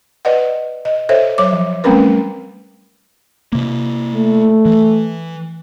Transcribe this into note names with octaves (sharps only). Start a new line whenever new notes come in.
B4 D5 D#5 F#5
D#5
A4 C5 C#5 E5
F#3 C#5 D6
F3
G3 A3 C4 C#4 A#4 B4
C3 A#3
A3
E3